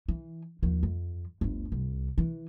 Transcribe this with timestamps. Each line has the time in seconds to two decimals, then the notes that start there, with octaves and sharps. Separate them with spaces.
0.08 E3
0.63 D#2 F3
0.83 F2
1.41 G1 D2
1.72 C2
2.18 E3